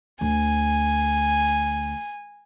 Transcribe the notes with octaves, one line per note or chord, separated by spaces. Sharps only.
D2 G#5